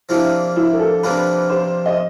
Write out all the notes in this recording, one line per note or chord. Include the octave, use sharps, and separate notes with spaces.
C3 F3 A#3 D4 E4 F4
E4
A#4
A4
C3 F3 A#3 D4 F4 B4
C5
D#5